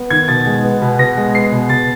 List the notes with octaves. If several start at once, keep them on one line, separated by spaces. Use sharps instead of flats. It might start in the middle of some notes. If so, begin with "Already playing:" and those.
Already playing: B3
D#3 G#6
B2 A6
G#3
B3
B2
B2 A#6
G#3
B3 C7
B2
B2 A6